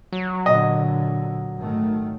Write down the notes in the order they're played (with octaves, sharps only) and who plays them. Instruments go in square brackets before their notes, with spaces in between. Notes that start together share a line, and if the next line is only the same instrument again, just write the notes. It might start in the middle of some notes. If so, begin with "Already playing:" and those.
[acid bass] F#3
[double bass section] A#2 D3 [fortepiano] D#5
[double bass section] G#1 D#3 A3